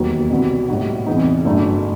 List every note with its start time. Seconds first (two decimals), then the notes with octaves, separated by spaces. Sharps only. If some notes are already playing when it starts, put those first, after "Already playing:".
Already playing: E1 D#2 D#3 F#3 B3
0.30 C2 B2 F#3 B3 F#4
0.68 A2 G3 D#4 F#4
1.06 E2 C3 E3 B3 D#4
1.45 G1 F#2 F#3 A3